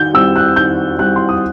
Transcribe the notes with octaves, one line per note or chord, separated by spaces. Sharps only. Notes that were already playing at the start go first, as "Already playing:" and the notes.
Already playing: D#3 G6
G3 C4 E4 E6
F#6
D#3 G6
G3 C4 E4 F#6
C6
D#6